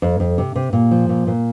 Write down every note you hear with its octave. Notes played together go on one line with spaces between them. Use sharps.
F2
F2
C3
C3
A#2
F3
A#2
A#2